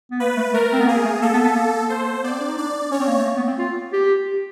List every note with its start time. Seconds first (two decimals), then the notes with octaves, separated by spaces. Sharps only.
0.11 B3
0.20 A#3 B4
0.37 A3
0.54 A3 A#4
0.73 C4
0.81 B3
0.88 A#3 G#4
1.05 A3
1.22 A#3 A4
1.33 B3
1.44 B3
1.56 A#3
1.89 C5
2.23 B3 D5
2.32 C4
2.40 D4
2.48 D#4
2.58 D4 D5
2.91 C#4 C#5
3.00 C4
3.08 A#3
3.17 A3
3.25 A#3
3.37 B3
3.48 C4
3.59 F4
3.93 G4